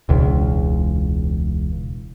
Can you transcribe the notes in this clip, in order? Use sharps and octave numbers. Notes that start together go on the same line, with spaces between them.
E1 C#2